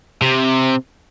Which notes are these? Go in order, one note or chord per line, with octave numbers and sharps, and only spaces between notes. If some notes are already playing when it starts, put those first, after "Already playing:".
C3